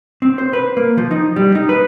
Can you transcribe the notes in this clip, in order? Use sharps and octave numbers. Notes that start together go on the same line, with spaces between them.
C4
C5
B4
A#3
F3
D#4
G3
D#4
B4